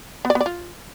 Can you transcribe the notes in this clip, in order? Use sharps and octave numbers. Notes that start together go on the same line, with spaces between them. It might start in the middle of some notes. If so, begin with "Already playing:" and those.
B3
D5
B3
D5
F4